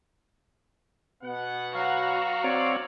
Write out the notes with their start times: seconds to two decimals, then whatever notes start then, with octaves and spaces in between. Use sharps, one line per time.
1.24 B2 B3 F#5
1.74 F#3 F#4 F5 A#5
2.44 C4 C#5 D5